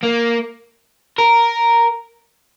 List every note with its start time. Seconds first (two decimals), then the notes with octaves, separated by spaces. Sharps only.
0.03 A#3
1.18 A#4